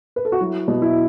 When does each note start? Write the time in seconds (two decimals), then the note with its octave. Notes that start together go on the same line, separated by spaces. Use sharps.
0.16 B4
0.25 A4
0.32 F#4
0.41 F#3 E4
0.68 B2
0.82 E4